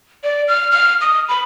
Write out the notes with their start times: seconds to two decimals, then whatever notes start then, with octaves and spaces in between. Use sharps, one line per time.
0.24 D5
0.48 F6
0.72 F6
1.01 D#6
1.29 B5